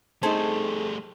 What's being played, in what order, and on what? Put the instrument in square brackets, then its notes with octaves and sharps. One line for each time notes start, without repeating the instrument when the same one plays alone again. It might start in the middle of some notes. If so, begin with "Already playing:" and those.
[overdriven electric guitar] G3 A3 [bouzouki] C4 A4 G#5 [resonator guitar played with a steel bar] D#4 C5 [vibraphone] G#4